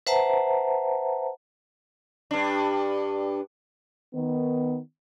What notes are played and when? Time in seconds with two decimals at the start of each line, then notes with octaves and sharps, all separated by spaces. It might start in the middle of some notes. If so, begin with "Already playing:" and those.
0.07 B4 C5 E5 F#5 A5 A#5
2.31 G2 D4
4.14 D#3 B3